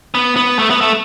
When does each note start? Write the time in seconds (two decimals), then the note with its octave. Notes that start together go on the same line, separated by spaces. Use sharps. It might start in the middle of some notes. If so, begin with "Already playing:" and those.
0.15 B3
0.36 B3
0.59 A3
0.70 B3
0.81 A3